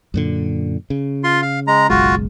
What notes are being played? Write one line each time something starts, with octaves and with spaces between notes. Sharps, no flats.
F#2 A#2 D3
C#3
F4 C6
F5
G#3 A#5
F#1 B1 G#3 F4 F#4